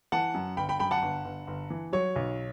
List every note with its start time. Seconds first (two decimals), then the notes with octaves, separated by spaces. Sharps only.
0.12 E3 F#5 A5
0.34 F#2
0.57 G1 G5 B5
0.69 G5 B5
0.79 F#2 G5 B5
0.91 F#5 A5
1.02 G1
1.25 G1
1.47 G1
1.70 E3
1.93 F#3 C#5
2.16 B1